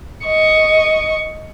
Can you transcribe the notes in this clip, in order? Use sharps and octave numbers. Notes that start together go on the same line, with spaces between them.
D#5 C#6